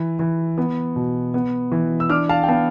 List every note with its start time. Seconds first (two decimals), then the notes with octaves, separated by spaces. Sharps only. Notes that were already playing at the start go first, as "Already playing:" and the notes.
Already playing: E3
0.19 E3
0.58 B3
0.96 B2
1.34 B3
1.72 E3
2.00 E6
2.10 D4 D6 F6
2.29 F5 A5
2.43 G5
2.48 B3 F5 A5